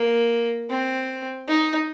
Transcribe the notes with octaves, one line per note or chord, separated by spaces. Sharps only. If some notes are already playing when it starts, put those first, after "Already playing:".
Already playing: A#3
C4
D#4